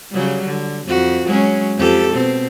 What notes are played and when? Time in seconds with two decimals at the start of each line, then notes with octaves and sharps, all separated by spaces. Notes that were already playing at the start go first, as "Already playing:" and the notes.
0.11 C#3 F#3 G3
0.45 D3
0.87 F2 F#4
1.27 F#3 G#3 C#4
1.77 F2 G4 A4
2.12 B2 C4